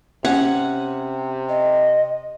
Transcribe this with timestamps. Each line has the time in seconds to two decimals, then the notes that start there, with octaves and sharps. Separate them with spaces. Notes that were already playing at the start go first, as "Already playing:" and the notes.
0.25 C3 C#4 F#5
1.49 D#5